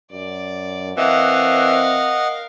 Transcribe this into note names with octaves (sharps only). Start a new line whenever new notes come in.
F#2 D5
E3 C4 A#4 D#5 F5 F#5